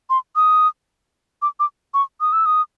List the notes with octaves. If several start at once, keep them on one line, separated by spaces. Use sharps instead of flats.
C6
D#6
D6
D6
C#6
D#6
E6
D#6